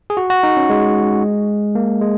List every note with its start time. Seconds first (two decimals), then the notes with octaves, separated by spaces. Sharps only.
0.10 G#4
0.17 F#4
0.30 F#4
0.43 D#4
0.57 C#4
0.70 G#3
1.75 A#3
2.01 G#3